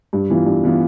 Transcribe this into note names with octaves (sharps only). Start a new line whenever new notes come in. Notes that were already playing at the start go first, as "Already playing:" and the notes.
G2
E3 B3 F4
G2
E3 B3 F4